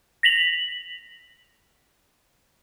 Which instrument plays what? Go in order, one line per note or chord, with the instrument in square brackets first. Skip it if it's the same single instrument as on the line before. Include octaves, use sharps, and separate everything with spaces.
[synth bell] A#6 B6 F7 F#7